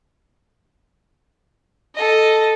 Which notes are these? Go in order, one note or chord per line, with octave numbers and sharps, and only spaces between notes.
A4 D#5